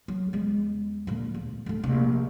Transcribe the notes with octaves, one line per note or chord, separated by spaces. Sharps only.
F#3
E2 G#3
D2 A#2
E2
D1 A3
A#1 C3